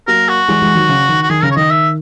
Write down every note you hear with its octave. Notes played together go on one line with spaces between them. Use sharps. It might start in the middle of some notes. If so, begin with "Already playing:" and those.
F#3 A#3 A#4
F#4
E3 G#3
E3 G#3
D#3 F#3
C#3
D#3
F#4
D#3 G#4
C#3 A#4
C#5
D#3 D#5
E5